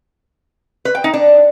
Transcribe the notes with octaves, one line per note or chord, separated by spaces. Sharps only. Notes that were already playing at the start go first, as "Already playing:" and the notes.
B4
G5
D#4
D4